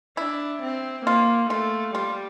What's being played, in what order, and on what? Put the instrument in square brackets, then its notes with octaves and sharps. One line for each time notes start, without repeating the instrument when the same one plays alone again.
[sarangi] D4 [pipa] E4
[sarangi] C4
[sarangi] A#3 [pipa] F4
[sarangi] A3 [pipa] F4
[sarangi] G3 [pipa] F4